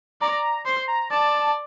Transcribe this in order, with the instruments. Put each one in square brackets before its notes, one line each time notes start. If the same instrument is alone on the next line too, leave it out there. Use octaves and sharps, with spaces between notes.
[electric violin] D5 [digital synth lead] A#5
[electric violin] C5 [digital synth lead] C6
[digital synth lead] A#5
[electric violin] D5 [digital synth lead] A5